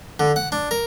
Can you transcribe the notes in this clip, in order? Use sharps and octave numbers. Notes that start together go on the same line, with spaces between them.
D3
F#5
D4
A#4